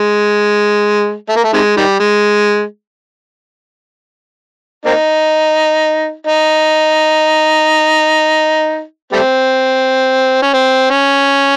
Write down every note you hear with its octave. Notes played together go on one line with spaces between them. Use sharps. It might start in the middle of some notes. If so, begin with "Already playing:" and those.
Already playing: G#3
A3
A#3
A3
C3 D#3 G#3
D#3 G3
G#3
A#3 C4 D#4
D#4
G3 A3 C4
C#4
C4
C#4